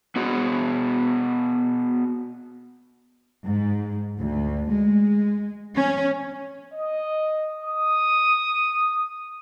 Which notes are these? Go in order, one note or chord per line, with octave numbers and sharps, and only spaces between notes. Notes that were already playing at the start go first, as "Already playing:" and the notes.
B3 F#4 G#4
G#2
D2
G#3
C#4
D#5
D#6